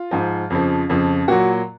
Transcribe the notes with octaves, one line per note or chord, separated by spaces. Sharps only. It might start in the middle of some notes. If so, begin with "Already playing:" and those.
Already playing: F4
G#2 F3
F2 C#3 F3
F2 C#3 F3
A#2 F#3 F#4